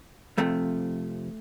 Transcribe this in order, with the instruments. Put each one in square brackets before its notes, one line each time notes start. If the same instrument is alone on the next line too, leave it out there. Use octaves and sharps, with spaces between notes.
[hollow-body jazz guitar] F2 C3 F3 A3